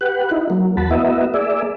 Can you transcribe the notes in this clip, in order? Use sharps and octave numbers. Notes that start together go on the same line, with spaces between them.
G4 B4 F#5
D#4 E4
F#3 A#3
E2 F#4 A5 B5
A#3 B3 E4 F#4 D#5 E5
A#3 G#4 D5 E5